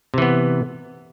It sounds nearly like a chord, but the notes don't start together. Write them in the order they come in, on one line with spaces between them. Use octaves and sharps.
C3 E3 B3